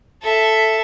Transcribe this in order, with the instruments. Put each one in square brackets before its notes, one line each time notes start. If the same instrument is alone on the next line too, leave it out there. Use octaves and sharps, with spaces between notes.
[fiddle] A4 E5